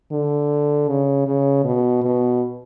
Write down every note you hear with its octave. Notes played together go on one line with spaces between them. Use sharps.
D3
C#3
C#3
B2
B2